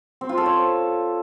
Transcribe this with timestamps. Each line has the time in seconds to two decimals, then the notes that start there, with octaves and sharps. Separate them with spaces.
0.21 C4
0.29 F4
0.38 A4
0.46 C#5